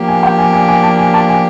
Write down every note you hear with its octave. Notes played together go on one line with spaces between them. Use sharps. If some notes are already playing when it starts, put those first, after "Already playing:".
Already playing: F3 A#3 D4 G4
G#5
G5
G#5
G#5
G#5
A5
G#5
A5
G#5